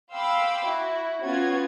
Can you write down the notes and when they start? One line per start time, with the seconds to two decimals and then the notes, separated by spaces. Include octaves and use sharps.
0.14 F5 G5 B5 C6 D6 E6
0.67 E4 F#4
1.25 B3 C#4 F4 F#4 G#6